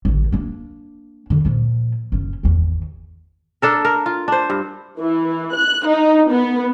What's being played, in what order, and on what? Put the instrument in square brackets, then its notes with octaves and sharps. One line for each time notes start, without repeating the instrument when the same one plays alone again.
[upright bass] A1 D3
A#3 D4
E2 D3
A#2 F3
F#1 C#4
G#1 E2
[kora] D4 A4 A#4
A#4
F4
D4 C5
G2
[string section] E3
F#6
D#4
B3